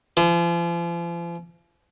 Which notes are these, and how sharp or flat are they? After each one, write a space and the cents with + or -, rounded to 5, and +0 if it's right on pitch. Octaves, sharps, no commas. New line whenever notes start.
F3 -40